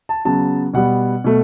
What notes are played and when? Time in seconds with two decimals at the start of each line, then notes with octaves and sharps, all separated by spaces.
0.09 A5
0.25 C#3 F#3 B3 A5
0.74 B2 G3 B3 F#5
1.24 B2 A3